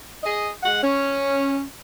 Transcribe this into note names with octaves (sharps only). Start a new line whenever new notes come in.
G#4 D#5
G#3 F#5
C#4